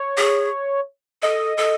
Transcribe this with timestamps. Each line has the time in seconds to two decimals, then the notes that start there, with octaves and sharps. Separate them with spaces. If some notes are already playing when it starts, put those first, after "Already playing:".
Already playing: C#5
0.17 G#4
1.23 A4 D#5
1.57 A4